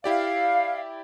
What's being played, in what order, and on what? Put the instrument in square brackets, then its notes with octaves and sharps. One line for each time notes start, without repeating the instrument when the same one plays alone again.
[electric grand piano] E4 G4 D5 [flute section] F5